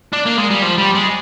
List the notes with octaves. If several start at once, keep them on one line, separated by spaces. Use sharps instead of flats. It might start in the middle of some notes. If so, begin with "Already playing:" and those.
D4
A#3
G#3
G3
F3
G3
G#3